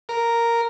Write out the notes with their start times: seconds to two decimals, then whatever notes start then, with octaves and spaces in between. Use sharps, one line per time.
0.09 A#4